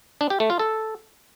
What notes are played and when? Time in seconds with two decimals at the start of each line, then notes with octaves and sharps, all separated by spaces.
0.21 D4
0.30 G4
0.40 A3
0.50 F4
0.59 A4